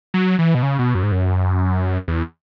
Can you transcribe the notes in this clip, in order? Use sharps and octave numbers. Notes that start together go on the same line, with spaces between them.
F#3
E3
B2
C#3
B2
F#2
G#2
F#2
E2